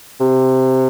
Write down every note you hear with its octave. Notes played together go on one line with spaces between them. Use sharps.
C3